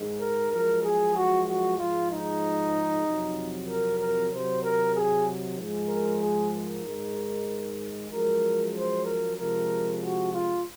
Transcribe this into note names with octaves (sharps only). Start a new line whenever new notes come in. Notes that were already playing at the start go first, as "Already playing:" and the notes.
Already playing: G#2 D#3 G#3
A#4
F#2 F3 G#3 A#4
G#4
F#4
F#4
G#2 F3 G#3 F4
D#4
F2 C3 F#3
A#4
A#4
C3 D#3 F#3 C5
A#4
G#4
G#2 F3 G#3
A#4
G#4
A#4
G#2 D#3 G#3
F#2 F3 G#3 A#4
C5
A#4
C3 F3 G#3 A#4
F#4
F4